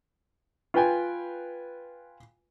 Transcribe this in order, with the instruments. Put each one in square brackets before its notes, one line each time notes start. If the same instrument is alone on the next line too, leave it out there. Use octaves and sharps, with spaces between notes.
[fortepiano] F4 B4 G5 G#5